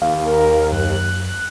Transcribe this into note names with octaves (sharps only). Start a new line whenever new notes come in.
D#2 F5
A#4
F#2 F#6